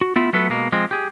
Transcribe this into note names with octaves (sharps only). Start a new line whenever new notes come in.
F#4
A3 B3 E4 F4
F#3 A3 B3 A4 B4
B2 G#3 A#3
F3 G#3 C4
G4 G#4